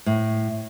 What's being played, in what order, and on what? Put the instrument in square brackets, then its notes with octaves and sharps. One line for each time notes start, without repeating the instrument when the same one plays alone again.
[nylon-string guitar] A2